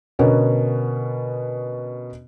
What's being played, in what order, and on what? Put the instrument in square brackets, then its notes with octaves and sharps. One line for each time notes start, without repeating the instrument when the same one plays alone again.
[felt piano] B2 D3 B3 C#4 A#4